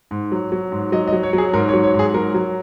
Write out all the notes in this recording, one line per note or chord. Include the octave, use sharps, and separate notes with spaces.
G#2
F#3
F#3
G#2
F#3 D#5
D#5
F#3
C#5
F#3
G#4
G#2 A#4
C#5
F#3
C#5
G#2 G#4
F#3 A#4
F#3